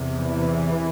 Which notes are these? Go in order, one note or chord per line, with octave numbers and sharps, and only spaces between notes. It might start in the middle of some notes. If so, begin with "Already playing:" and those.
Already playing: E2 C3
E3